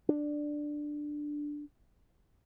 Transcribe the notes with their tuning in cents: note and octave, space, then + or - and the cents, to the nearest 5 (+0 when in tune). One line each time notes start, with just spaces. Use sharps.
D4 +5